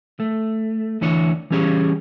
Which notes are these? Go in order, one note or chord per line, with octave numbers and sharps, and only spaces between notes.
A3
D2 E3 D4 C#5
E3 G3 C#4 G4 G#4 C#5